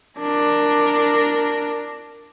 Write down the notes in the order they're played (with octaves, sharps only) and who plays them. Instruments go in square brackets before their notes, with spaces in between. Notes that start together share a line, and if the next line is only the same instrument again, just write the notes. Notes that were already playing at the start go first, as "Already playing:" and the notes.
[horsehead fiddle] D4 A#4